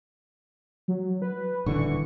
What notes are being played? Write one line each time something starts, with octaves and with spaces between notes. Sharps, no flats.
F#3
B4
D#1 D3 E3 C#6